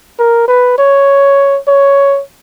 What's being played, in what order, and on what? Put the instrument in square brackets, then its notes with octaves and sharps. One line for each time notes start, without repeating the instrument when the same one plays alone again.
[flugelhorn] A#4
B4
C#5
C#5